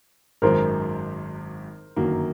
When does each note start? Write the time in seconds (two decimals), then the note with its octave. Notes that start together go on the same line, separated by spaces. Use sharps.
0.42 G#1 F#2 D#3 G#3 A#4 C5
1.96 G1 F#2 D#3 F#3 A#3